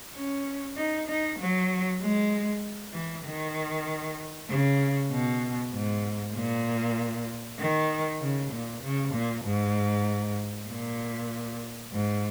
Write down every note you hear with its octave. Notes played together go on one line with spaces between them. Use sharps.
C#4
D#4
D#4
F#3
G#3
E3
D#3
C#3
B2
G#2
A#2
D#3
C#3
A#2
C#3
A#2
G#2
A#2
G#2